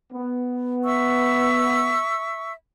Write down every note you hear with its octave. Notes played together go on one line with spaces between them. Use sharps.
B3
E5 C#6 E6